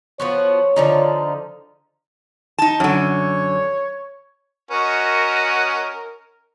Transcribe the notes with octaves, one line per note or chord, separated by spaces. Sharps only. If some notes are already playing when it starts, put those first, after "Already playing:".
F3 B3 F#4 C#5
D3 F3 D#4
D#4 A5
F#2 D3 C#5
C#4 F#4 A#4 D#5